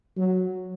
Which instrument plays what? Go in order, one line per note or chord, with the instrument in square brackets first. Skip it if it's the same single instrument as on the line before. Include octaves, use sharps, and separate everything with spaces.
[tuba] F#3